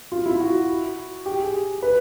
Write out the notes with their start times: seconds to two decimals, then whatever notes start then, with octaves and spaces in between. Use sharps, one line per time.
0.12 F4
0.26 E4
0.41 F#4
1.26 G4
1.40 G#4
1.82 B4